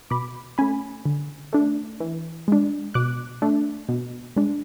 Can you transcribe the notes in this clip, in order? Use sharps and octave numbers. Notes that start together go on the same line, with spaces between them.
B2 B5 D6
A3 C#4 G#5 B5
D3
A3 D4
E3
G#3 D4
B2 D6 F#6
A3 D4
B2
G#3 D4